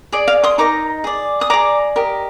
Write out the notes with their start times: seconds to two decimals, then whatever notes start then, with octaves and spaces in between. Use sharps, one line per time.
0.12 G#4 D5 D#5
0.28 F5
0.44 C6 D#6
0.58 D#4 A#4 D#5 A#5 D6
1.04 G#4 D5
1.41 D#6
1.50 G#4 D5 A#5 D6
1.96 G4 A#4 D#5